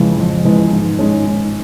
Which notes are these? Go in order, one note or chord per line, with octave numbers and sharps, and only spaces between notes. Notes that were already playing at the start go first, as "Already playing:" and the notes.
Already playing: F2 C#3 E3 G#3
F2
C#3 E3 G#3
G#2
D#3 G#3 C#4
G#2